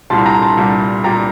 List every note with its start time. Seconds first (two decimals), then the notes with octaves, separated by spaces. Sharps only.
0.10 C2 A#2 G3 A5 C6
0.26 G5 A#5
0.42 A5 C6
0.57 C2 A#2 G3
1.04 A#2 G3 G5 A#5